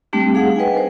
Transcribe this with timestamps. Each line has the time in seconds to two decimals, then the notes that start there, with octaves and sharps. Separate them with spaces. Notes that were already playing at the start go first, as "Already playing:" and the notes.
0.13 G3 A3 C4 D4 G4
0.34 D#4 G#4 F5 F#5 D#6
0.56 B4 D#5 G5 G#5
0.74 A#4 C5